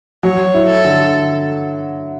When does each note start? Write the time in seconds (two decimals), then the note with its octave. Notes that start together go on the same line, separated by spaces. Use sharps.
0.23 F#3 C#5
0.54 E4
0.70 A4
0.85 D3